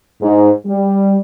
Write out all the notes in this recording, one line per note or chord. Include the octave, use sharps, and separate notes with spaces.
G#2
G3